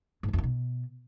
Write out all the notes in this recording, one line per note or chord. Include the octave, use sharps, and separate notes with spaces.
G#2
F#3
F2
D#3
B2